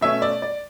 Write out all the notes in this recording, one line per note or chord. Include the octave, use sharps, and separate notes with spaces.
B2 A3 C#4 E5
D5
D5